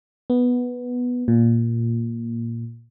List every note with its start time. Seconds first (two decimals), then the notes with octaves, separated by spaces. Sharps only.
0.30 B3
1.28 A#2